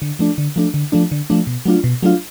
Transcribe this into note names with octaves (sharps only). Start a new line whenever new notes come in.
D3
F3 A3 D4
D3
F3 A3 D4
D3
F3 A3 D4
D3
F3 A3 D4
B2
F#3 A3 D4 F4
B2
F#3 A3 D4 F4